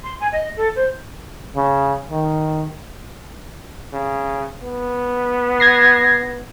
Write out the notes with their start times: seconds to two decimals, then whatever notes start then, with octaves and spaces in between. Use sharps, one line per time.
0.04 C6
0.20 G#5
0.32 D#5
0.57 A4
0.76 C5
1.56 C#3
2.11 D#3
3.93 C#3
4.63 B3
5.60 G#6 A#6 C7